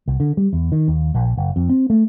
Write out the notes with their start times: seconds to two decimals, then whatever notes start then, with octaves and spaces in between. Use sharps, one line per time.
0.08 C2
0.20 D3
0.37 G3
0.53 E2
0.72 D#3
0.88 D#2
1.14 A#1
1.38 F#1
1.56 F2
1.69 C4
1.90 A3